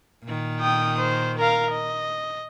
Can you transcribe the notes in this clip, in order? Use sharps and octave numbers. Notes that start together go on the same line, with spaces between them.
A#2 D#3
G5 D#6
C5
A#4 F5
D#5